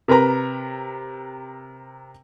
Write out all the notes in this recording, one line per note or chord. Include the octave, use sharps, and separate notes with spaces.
C3 A#4 B4 A#5